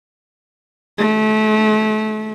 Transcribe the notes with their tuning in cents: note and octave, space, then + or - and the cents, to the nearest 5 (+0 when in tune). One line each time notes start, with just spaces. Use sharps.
A3 -30